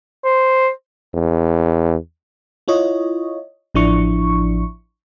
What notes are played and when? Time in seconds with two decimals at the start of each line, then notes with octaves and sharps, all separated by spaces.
0.25 C5
1.14 E2
2.68 E4 F4 C#5 D#5
3.75 A1 F3 D4 E4 C#6